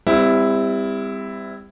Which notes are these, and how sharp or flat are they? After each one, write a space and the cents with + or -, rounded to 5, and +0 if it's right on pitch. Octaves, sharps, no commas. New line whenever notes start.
G3 +30 C4 -25 E4 +0